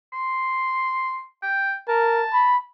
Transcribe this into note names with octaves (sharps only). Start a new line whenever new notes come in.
C6
G5
A#4 A5
B5